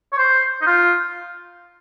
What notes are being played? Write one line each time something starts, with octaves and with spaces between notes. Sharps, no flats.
C#5
C5
D#4
F4